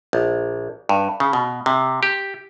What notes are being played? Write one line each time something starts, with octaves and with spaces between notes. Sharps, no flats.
A#1
G2
C#3
B2
C3
G4